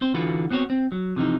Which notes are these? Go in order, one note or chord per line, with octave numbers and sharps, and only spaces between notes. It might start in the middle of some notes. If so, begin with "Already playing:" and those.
C4 C5
D3 E3 F4 F#4 B4
B3 C4 F#4 A#4 C#5
C4
F#3
C3 E3 F3 D#4